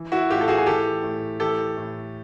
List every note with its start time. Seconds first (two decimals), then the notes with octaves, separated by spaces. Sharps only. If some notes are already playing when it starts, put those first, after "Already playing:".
Already playing: E3
0.12 E4 F#4
0.30 A2 F4 G4
0.41 A4
0.48 F#4 G#4
0.58 G#4
0.66 E3 G4 A4
1.03 A2
1.40 E3 G4 A4
1.77 A2